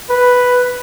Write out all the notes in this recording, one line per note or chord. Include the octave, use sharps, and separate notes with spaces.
B4